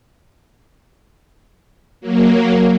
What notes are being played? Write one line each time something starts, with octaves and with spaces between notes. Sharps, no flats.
F#3 A#3